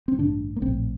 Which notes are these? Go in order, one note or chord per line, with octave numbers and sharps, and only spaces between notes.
C4
A1 G2 D3 D4
A#3
A#1 A2 C4